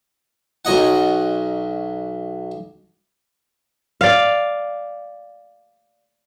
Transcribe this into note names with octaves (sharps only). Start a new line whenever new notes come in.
B1 F#3 D#5 F#5
D5 F5